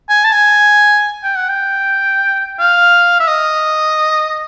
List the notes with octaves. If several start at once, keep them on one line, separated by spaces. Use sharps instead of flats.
G#5
A5
G#5
G5
F#5
G5
F5
E5
D#5